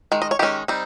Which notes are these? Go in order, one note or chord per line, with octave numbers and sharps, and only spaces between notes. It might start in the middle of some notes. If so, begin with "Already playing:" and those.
D#3 G#3
D#5
C#5
D#3 G#3 C#4 G4
G3 C4 D#4